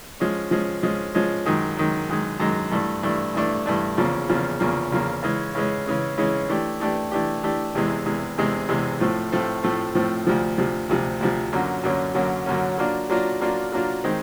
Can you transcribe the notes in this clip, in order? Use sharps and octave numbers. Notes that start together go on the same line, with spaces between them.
F3 G#3 C#4
F3 G#3 C#4
F3 G#3 C#4
F3 G#3 C#4
F#2 D#3 G#3
F#2 D#3 G#3
F#2 D#3 G#3
F#2 D#3 G#3
G2 E3 A3 D4
G2 E3 A3 D4
G2 E3 A3 D4
G2 E3 A3 D4
E2 C#3 F3 A#3
E2 C#3 F3 A#3
E2 C#3 F3 A#3
E2 C#3 F3 A#3
C#3 E3 G#3 C#4
C#3 E3 G#3 C#4
C#3 E3 G#3 C#4
C#3 E3 G#3 C#4
E3 A3 D4 G4
E3 A3 D4 G4
E3 A3 D4 G4
E3 A3 D4 G4
E2 C3 E3 G#3
E2 C3 E3 G#3
E2 C3 E3 G#3
E2 C3 E3 G#3
A2 F3 A3 C4
A2 F3 A3 C4
A2 F3 A3 C4
A2 F3 A3 C4
D2 C3 F3
D2 C3 F3
D2 C3 F3
D2 C3 F3
F#2 D3 F#3 A#3 C#4
F#2 D3 F#3 A#3 C#4
F#2 D3 F#3 A#3 C#4
F#2 D3 F#3 A#3 C#4
F#3 A#3 D4 F4
F#3 A#3 D4 F4
F#3 A#3 D4 F4
F#3 A#3 D4 F4
D#3 G#3 C4